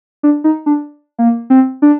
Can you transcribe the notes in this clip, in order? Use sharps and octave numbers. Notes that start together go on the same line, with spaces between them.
D4
D#4
D4
A#3
C4
D4